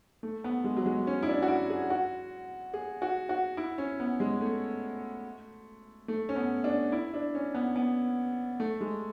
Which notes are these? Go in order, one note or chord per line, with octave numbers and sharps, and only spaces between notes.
A3
B3
G#3
F#3
G#3
C#4
E4
D4
F#4
E4
G#4
F#4
G#4
F#4
F#4
E4
C#4
B3
G#3
A3
A3
C#4
B3
D4
E4
D4
C#4
B3
B3
A3
G#3